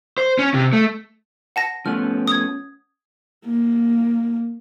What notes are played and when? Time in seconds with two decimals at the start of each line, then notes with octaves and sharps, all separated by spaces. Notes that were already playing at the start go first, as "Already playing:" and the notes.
0.18 C5
0.39 C#4
0.54 C3
0.73 A3
1.56 F#5 A5 A#6
1.86 F3 A3 B3 C#4 F6
2.28 D#6 G#6
3.45 A#3